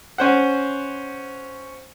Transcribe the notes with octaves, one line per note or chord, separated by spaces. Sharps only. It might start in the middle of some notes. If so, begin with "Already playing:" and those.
C#4 C5 F#5